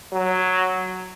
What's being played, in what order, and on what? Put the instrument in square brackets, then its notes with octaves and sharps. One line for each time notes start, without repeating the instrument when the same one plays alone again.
[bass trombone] F#3